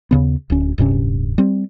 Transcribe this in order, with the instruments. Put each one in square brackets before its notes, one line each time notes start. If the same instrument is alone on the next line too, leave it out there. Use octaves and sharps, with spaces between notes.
[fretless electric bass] D#2 C#3 B3
D1 D2 C#4
D1 G2 C3 C#4
G3 C4